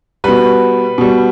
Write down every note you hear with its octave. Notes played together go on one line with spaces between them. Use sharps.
B2 G3 B4
B2 G3